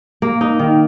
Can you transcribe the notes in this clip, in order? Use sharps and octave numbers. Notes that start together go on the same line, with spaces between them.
A#3
D#4
D#3